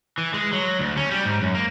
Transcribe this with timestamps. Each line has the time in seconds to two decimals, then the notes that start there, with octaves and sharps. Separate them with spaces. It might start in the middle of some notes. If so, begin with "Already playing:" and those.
0.18 E3
0.34 G#3
0.53 F#3
0.79 D2
0.97 C#4
1.11 G3
1.25 G#2
1.42 F#2
1.55 A#3